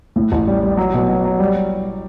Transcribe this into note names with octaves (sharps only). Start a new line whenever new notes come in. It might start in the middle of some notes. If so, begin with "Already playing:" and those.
A2
A1
G3
G3
F#3
B2
F#3
F#3
G3